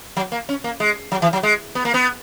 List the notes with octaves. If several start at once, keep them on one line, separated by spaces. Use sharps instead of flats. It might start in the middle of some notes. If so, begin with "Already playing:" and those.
F#3
A#3
C#4
A#3
G#3
F#3
E3
F#3
G#3
B3
A#3
B3